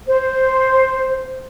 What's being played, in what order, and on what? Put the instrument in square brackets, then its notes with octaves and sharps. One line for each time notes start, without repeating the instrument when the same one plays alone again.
[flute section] C5